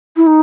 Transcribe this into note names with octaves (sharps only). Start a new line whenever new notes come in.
E4
D#4